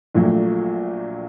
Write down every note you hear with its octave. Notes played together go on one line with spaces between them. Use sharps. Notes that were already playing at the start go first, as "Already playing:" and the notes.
A#1 A#2 F#3 A3